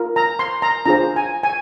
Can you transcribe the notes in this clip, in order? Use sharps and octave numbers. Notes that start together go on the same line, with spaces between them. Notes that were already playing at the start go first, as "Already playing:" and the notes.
Already playing: F4 A#4
A#5
C6
A#5
D4 F4 G#4 C5 A#5
G#5
G#5